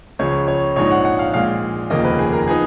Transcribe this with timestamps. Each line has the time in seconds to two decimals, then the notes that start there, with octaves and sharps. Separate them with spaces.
0.19 C#2 C#3 F3 C#5
0.48 C#5
0.76 A#1 G#2 F3 G#3 D#4 C#5
0.91 F#5
1.05 F#5
1.19 F5
1.34 A#1 A#2 G#3 F5
1.90 F1 D#2 C#3 F3 A#3 D#5
2.05 B4
2.19 G#4
2.33 A#4
2.48 F3 B3 D#4 G#4